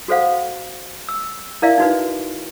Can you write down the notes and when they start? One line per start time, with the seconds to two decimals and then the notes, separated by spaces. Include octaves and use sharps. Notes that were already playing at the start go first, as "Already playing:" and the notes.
0.08 F#4 A4 C5 F5 F#5
1.09 E6
1.62 E4 A#4 D5 E5 F5
1.78 D#4 F#4 B4